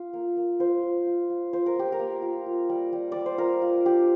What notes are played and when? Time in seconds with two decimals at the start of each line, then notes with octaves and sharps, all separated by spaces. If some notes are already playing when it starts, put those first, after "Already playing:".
Already playing: F4
0.13 A#3
0.37 A#3
0.60 F4 C5
0.83 F4
1.06 F4
1.30 F4
1.53 F4 C5
1.66 A#4
1.76 A#3 G4
1.92 A#4
1.99 A#3
2.22 F4
2.46 F4
2.69 G3
2.92 G3
3.12 G3 D5
3.26 C5
3.38 F4 A#4
3.62 F4
3.86 D4 G4